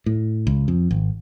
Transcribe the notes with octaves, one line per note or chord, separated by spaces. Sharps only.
A2
C#2
F2
G#1